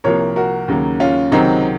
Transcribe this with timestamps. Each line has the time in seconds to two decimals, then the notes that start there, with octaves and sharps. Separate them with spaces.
0.04 C2 C3 F3 A#3 A#4 C#5
0.36 F#4 A#4
0.68 D#2 C#3 F#3 A#3
1.00 C#4 F4
1.32 C#2 C3 D#3 F#3 C4 D#4